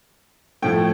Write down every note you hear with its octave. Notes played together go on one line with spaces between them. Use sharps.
A2 F3 A3 G5